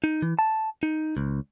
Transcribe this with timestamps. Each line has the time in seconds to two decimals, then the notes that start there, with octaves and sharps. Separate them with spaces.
0.04 D#4
0.22 E3
0.39 A5
0.83 D#4
1.17 C#2